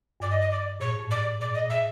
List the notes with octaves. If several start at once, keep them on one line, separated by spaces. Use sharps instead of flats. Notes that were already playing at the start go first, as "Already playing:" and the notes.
G2 D5
D#5
D#5
D5
A#2 C#5
A2
G#2
A2 D5
A#2 D5
D#5
A#2
A#2 E5